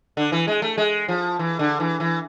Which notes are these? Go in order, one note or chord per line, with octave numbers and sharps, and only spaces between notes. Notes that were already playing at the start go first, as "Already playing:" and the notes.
D3
E3
G#3
A3
G#3
F3
E3
D3
E3
E3